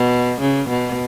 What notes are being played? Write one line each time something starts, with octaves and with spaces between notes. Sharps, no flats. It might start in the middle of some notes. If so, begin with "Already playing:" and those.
Already playing: B2
C#3
B2